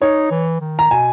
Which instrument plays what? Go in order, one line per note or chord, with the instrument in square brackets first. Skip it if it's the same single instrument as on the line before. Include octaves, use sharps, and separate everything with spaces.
[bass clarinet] D#4 [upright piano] C#5
[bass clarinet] E3
D#3
[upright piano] A#5
[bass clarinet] B2 [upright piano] G#5